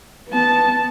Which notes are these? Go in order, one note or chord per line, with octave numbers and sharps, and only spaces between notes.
B3 A5